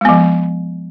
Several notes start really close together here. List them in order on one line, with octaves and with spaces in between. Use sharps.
G#3 B3 F3